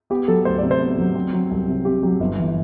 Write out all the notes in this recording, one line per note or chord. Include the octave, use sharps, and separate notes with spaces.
B3 G4
F#3 A4
D2 C5
C3 D5
C5
B3
F#3
C4
F#3
C2
C3
C4 G4
F#3 G4
G1
E3